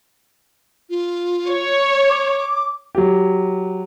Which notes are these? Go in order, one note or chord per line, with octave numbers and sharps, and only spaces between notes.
F4
C#5
D6
F#3 G4